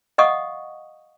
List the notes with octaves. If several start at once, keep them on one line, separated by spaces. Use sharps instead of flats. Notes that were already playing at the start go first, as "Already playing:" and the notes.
D#5 F5 F#5 C#6 D#6